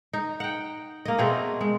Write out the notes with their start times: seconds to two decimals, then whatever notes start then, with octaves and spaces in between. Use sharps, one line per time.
0.13 D#4
0.40 F#5 G5
1.05 A#3 D#5
1.18 B2 A3 C4 G#4
1.61 G#3